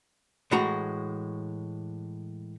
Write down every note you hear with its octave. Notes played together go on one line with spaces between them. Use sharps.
A2 E3 G#3 F#4 A#5